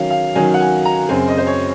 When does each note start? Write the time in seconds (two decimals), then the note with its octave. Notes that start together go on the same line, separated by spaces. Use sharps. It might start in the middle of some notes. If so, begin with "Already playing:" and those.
Already playing: D#3 F#3 C#4 F5
0.10 F5
0.35 D#3 F#3 C#4 G#5
0.54 F#5
0.61 G#5
0.85 A#5
1.09 F#2 C#3 F#3 C4 G#5
1.28 D#5
1.37 C5
1.47 C#5